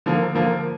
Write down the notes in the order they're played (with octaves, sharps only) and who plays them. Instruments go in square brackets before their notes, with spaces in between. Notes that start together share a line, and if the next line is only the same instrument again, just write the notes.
[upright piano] D3 F3 A#3
D3 F3 A#3